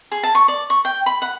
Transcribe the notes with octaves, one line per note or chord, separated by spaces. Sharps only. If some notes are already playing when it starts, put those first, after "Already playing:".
G#4
A5
C#6
D5
C#6
G5
B5
F#5